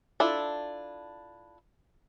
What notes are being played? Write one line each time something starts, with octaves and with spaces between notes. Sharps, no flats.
D4 E4 F4 A4